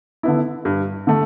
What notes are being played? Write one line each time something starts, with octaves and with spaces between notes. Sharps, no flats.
D3 B3 E4
G2
D3 A3